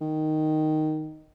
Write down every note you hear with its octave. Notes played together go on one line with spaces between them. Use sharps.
D#3